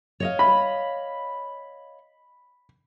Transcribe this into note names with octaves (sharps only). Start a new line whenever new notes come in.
C#5 D#5 F5
B5